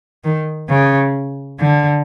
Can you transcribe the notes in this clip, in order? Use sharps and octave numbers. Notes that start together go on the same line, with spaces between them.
D#3
C#3
D3